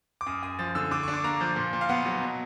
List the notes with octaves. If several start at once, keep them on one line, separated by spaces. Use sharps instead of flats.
D6
F#2 D#6
F#2 D#6
F3 A6
D3 E6
D3 D6
D4 C#6
D6
A#3 A#5
F3
A#2
A#2
F5
B3 F#5
F#3
B2